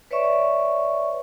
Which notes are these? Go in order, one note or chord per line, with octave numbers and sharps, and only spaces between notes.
B4 C#5 D5 E5 C#6